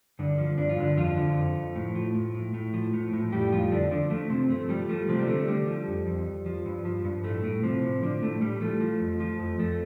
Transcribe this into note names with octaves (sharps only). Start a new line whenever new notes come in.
G2 D3 D4
F3
G2 D4
F4
G2 D3 D4
F2 F3 F4
D3
F2
F2
A2
F3
A2
A2
A2
F3
A2
A2
F2 G3 G4
F2 F3 F4
F2 D3 D4
D3 F3 D4
F3 A3
C3 F3 C4
G2 A3
F3 G3
F3 A3
C3 F3 C4
G3
D3 A3
D3 G3
F3
F2
F2
F2
F3
G2
F3
G2
A2 A3
A2
C3 F3 C4
A2
D3 F3 D4
A2 A3
A2 G3
F3 A3
F3
F2
F3
F2
F2 A3